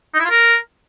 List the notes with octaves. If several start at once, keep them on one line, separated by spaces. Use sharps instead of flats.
D#4
E4
F4
A#4